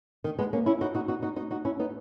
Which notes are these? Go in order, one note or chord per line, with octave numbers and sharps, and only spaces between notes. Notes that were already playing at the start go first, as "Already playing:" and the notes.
D#3
G#3 B3
A#3 C#4
C#4 E4
D#4 F#4
D#4 F#4
D#4 F#4
D#4 F#4
D#4 F#4
D#4 F#4
C#4 E4
B3 D#4